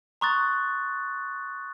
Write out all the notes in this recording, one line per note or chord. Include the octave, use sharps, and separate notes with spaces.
A#5 C6 C#6 D#6 F#6 A6